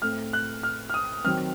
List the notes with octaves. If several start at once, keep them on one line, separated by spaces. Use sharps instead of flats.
A2 A3 C4 F6
F#6
F6
F6
D#6
D#3 F#3 C4 F6